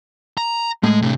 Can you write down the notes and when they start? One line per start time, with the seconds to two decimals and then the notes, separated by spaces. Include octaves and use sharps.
0.38 A#5
0.83 A2 G#3
1.02 C3 D4